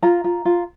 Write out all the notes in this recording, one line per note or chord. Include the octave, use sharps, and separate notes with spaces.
F4 A#5
F4
F4